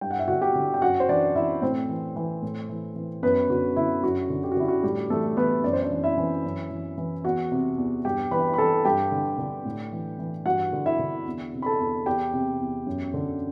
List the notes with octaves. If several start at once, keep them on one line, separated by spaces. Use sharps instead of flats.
G2 G5
F#5
E5
D3 F#4 F#5
G4 G5
D3
G5
F#2 F#4 F#5
C5
E3 D4 D5
E3 E4 E5
A2 C4 C5
E3
E3
A2
E3
E3
F#2 B3 B4
D3 F#4
D3 E4
F#2 F#4
D3
G4
F#4
D3 E4
F#4
A2 G3 G4
E3 A3 A4
E3 B3 B4
F#2 D5
C5
D4 D5
E3
E4 E5
E3
F#2
E3
E3
E2 F#4 F#5
C3
E2
G2 G4 G5
E3 B4 B5
B5
E3 A4 A5
G2 G4 G5
D3
D3
A2
E3
E3
G2 F#4 F#5
D3
E4 E5
D3
E2
C3
B5
A4 A5
E2
E2 G4 G5
C3
E2
F#2
D3